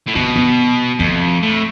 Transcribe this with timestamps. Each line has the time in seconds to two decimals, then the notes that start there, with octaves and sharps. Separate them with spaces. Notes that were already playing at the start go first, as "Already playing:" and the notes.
0.07 A2
0.15 B2 B3
0.36 B3
0.99 F2 A3
1.42 A2